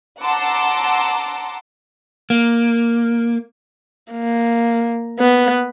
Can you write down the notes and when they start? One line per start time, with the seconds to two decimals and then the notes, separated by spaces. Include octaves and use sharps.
0.20 F#5 A5 A#5 C6 D6 E6
2.30 A#3
4.13 A#3
5.20 B3